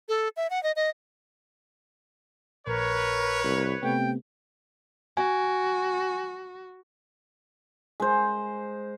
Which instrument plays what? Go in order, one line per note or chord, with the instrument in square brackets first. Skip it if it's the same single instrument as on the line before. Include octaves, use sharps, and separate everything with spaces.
[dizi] A4
E5
F#5
D#5
D#5
[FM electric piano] A#1 [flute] A#4 [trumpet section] B4 C#5
[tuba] C2
[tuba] C3 [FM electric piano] A3 B3 [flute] G5
[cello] F#4 [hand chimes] G#5
[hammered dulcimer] G#3 C5